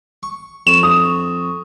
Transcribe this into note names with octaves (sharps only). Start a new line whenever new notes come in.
C#6
F2 C#6 E7
D#6